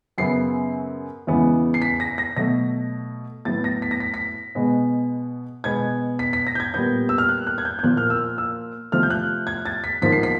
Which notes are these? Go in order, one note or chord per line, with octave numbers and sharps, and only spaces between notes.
F#2 C#3 F#3 B3 C7
E2 C#3 E3 G#3 B3
C7
B6
A#6
A#6
B2 F#3 A3 A#6
A2 F#3 B3 A6
A#6
B6
A#6
B6
B6
B2 G#3 B3
B2 G#3 B3 G#6
B6
B6
A#6
G6
G#6
A#2 G3 B3 G6
E6
F6
F#6
F#6
G#6
G6
G6
A#2 F3 A#3 F#6
F6
E6
E6
C3 F3 A3 F6
G6
F#6
G#6
A6
B6
G#2 F3 A#3 B6
C7
B6